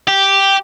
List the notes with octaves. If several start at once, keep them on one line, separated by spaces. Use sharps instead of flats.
G4